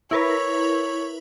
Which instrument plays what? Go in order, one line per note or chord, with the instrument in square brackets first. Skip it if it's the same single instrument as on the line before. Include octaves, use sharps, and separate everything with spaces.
[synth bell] E4 A#4 B4 [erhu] C#5